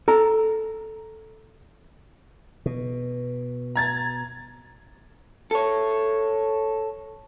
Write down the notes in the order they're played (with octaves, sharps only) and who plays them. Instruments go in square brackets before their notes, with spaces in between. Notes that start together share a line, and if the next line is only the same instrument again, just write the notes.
[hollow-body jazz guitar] A4 A#5
[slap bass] B2
[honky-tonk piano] A#5 G#6 A6
[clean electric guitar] A4 C#5